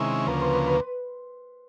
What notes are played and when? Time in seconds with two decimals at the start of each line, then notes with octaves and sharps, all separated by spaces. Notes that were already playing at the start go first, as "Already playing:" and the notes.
Already playing: C3 D#3 G#3 C#4 E4 A#4
0.27 D2 C#3 F3 A#3 B4
0.41 C5
0.53 B4
0.66 B4